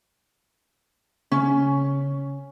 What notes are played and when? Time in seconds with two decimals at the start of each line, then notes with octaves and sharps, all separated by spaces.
1.32 C#3 C#4